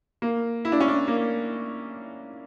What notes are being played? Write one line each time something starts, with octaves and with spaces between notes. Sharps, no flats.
A#3
E4
D4
C#4
D4
A#3